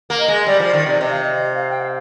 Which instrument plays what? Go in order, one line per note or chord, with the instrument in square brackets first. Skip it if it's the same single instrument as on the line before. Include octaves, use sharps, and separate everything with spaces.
[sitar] A#3
[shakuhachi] D#5
[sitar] G#3
[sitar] G3 [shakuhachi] D5
[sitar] F3
D#3
C3
[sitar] C3 [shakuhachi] D#5
[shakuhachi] F5
D#5
F5
G5
F5